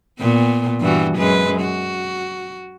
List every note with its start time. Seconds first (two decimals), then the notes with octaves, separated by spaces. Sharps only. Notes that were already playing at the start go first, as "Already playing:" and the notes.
0.19 A#2 B3
0.80 G2 E3 F#4
1.17 F#2 G#3 B4
1.61 F#4